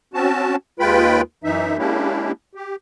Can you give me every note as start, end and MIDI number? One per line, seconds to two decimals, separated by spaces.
0.14 0.56 60
0.14 0.56 61
0.14 0.56 66
0.14 0.56 81
0.80 1.21 39
0.80 1.21 56
0.80 1.21 65
0.80 1.21 71
0.80 1.21 79
0.80 1.21 83
1.44 1.77 42
1.44 1.77 52
1.44 1.77 63
1.44 1.77 76
1.78 2.32 56
1.78 2.32 58
1.78 2.32 61
1.78 2.32 62
1.78 2.32 64
1.78 2.32 67
2.55 2.76 67